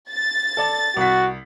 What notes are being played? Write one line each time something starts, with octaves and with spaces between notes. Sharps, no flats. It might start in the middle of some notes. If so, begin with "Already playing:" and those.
A6
A4 D5 A5
C2 F#4 B6